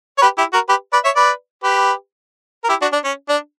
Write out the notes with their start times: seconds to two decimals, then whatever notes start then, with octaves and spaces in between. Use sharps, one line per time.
0.18 C#5
0.22 G4 B4
0.38 E4 G4
0.53 F#4 A#4
0.69 G4 B4
0.93 B4 D5
1.05 C#5 E5
1.16 B4 D5
1.63 G4 B4
2.64 A#4
2.69 E4 G4
2.82 D4 F#4
2.93 D4
3.04 C#4
3.29 D4